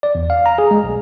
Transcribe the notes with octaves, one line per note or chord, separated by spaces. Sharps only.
D5
E2
F5
A#5
G#4
G#3
B1